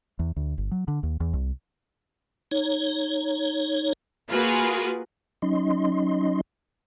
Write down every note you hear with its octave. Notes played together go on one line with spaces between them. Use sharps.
E2
D2
G1
F#3
D3
D#2
E2
C2
D#4 C#5
A#3 F4 F#4 G#4 B4
F#3 C#4 D#4 D#5 C6